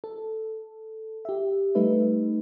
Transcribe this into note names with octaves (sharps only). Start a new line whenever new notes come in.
A4
G4 E5
G3 A3 D#4 B4 E5